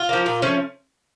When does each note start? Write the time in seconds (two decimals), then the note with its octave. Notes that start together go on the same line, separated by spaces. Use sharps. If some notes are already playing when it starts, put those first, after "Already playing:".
Already playing: F4
0.09 F3 A#3
0.26 A#2
0.42 F3 A3 C#4